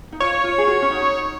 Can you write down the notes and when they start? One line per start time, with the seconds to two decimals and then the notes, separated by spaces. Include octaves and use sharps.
0.12 D#4
0.20 F4 C#5
0.44 F4
0.58 G#4
0.67 F#4
0.82 C#4
0.91 D#4